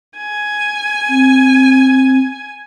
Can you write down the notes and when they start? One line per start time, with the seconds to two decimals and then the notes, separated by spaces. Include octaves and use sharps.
0.17 G#5
1.09 C4